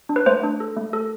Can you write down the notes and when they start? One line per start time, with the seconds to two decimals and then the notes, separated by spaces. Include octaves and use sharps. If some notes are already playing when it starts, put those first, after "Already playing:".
0.09 D4
0.16 B4
0.26 A3 C5
0.43 D4
0.60 A4
0.77 A3
0.93 A4